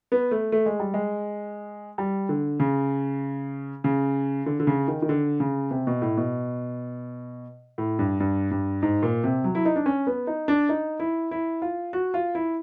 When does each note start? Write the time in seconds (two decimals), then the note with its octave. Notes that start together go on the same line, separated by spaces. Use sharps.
0.12 B3
0.31 A3
0.52 A3
0.66 G#3
0.80 G3
0.94 G#3
1.98 G3
2.29 D3
2.60 C#3
3.84 C#3
4.46 D3
4.60 D3
4.67 C#3
4.88 D#3
5.02 D#3
5.09 D3
5.40 C#3
5.71 C3
5.87 B2
6.02 A2
6.17 B2
7.78 A2
7.99 G2
8.20 G2
8.51 G2
8.82 G#2
9.02 A#2
9.24 C3
9.44 F#3
9.55 E4
9.65 D#4
9.76 D4
9.86 C#4
10.07 B3
10.27 D#4
10.48 D4
10.69 D#4
11.00 E4
11.31 E4
11.62 F4
11.93 F#4
12.14 F4
12.35 E4